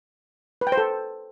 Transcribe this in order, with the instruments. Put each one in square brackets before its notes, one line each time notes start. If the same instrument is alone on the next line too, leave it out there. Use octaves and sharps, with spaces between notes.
[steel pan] B4
G5
C5
A4